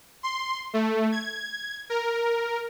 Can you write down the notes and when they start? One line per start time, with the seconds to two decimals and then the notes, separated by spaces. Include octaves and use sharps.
0.23 C6
0.73 A3
1.12 G#6
1.90 A#4